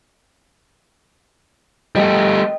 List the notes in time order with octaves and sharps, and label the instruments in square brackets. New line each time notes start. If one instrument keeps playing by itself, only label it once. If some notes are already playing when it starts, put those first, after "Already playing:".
[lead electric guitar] G3 A3 [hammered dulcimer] D#5 G5